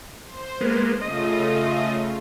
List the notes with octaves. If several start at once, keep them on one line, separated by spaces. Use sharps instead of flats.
C5
G#3 A#3 B3
C#3 A3 F4 D#5